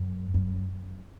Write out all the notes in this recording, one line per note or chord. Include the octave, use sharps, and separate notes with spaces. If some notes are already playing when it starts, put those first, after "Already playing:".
Already playing: F#2
F#2